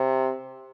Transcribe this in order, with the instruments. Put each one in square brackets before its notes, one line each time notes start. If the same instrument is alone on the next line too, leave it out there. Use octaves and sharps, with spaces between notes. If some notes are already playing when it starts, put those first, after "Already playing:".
Already playing: [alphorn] C3